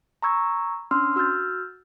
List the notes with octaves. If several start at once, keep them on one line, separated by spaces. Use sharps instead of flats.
A#5 B5 C#6 E6 G#6
C#4 D4 C6 E6 F6
F#4 E6 F6 G6 A6